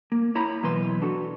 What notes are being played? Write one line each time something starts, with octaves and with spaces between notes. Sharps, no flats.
A#3
E4 C#5 A#5 B5
B2 E3 F#3 B4 C6
D4 F#4 A4